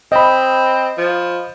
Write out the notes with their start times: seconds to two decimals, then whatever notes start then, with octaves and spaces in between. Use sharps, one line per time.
0.12 C4 D#5 B5
0.98 F3